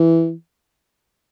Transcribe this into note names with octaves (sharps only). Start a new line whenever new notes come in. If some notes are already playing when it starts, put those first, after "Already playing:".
Already playing: E3